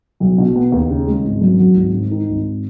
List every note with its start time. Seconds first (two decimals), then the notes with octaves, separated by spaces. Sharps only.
0.20 B1
0.38 B2
0.55 B3
0.72 D#2
0.89 C#3
1.07 G#3
1.25 G#1
1.41 F#2
1.59 F#3
1.76 G#1
1.93 G#2
2.11 D#3
2.29 G#1